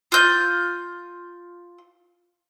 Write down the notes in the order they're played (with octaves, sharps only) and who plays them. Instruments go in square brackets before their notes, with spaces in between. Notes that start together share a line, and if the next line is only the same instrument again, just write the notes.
[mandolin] F4 G6